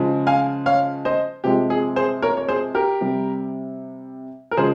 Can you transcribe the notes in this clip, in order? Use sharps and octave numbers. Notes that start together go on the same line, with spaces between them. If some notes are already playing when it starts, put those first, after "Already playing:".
Already playing: C#3 F3 G#3
F5 G#5
C#5 F5
C5 D#5
C3 F3 G#3 G4
G#4
G#4 C5
A#4 C#5
C#5
G#4 C5
G4 A#4
C3 G3
A#4
C#3 F3 G#3 G#4 C5